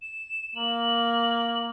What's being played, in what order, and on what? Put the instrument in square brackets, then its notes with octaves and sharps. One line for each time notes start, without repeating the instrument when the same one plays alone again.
[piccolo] E7
[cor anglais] A#3 [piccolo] F#7